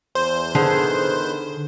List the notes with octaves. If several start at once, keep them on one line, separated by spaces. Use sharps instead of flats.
E2 C5
E2 D3 D#3 G#4 B4